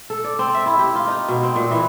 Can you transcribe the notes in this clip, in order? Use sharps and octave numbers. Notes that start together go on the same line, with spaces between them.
A4
D5
C4
E5
E4
G4
F4
D#4
B2
C4
A#2
E3